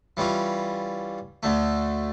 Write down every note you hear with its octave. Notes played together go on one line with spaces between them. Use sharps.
E3 G3 C#4 F4
D2 D3 A3